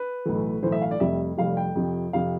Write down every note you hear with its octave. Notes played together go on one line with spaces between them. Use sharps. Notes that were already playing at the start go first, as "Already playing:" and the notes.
Already playing: B4
B1 A2 E3 A3
B1 A2 E3 A3 C5
E5
F5
D5
F1 F2 C3 G3 E5
F1 F2 C3 G3 F5
G5
F2 C3 F3
F2 C3 F3 F5